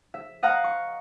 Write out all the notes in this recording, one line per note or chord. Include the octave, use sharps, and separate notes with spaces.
E5
D#5 F5 F#5 A#5
C#6